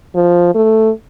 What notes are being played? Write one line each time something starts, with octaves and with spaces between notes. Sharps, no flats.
F3
A3